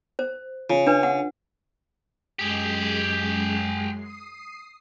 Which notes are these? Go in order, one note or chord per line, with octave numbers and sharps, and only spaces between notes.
C5
C#3 F4
D4 B4
F#5
F#2 G#3 G4 G#4 C7
D#6 C7